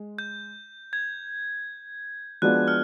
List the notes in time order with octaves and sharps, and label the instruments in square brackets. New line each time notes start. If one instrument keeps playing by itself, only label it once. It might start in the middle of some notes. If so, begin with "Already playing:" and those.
Already playing: [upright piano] G#3
[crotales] G6
G#6
[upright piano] F3 G#3 B3 D4 F#4 [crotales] F#6
[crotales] F6